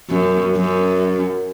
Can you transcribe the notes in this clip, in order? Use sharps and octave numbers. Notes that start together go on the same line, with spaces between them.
F#2
F#2